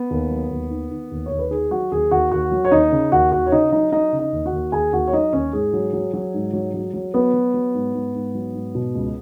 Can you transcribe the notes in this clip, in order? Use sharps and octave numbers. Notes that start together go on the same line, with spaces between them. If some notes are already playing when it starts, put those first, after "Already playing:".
Already playing: B3
D#2
F#3
D#2
D#3
D#3
D#2
C#5
D#2
B4
D#3 G#4
F#3 F#4
D#2 G#4
D#2 F#4 F#5
D#2 F#4 F#5
F#3
C#5
D#2 D#4 D#5
C#3
D#2 F#4 F#5
D#2 F#4 F#5
C#5
C#3 D#4 D#5
F#3 D#4 D#5
F#3 D#4 D#5
C#3
D#4 D#5
D#2
F#4 F#5
D#2
D#2 G#4 G#5
D#2 F#4 F#5
C#5
F#3 D#4 D#5
D#2 C#4 C#5
G#2 G#4
F#3
F#3
F#3
G#2
F#3
F#3
F#3
F#3 B3 B4
F#3
F#3
G#2
G#2
G#2
F#3
G#2
B2
C#2